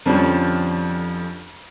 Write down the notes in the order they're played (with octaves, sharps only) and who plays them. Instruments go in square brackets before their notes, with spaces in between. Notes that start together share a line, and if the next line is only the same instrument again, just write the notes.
[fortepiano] F2 D3 F3 G3 C#4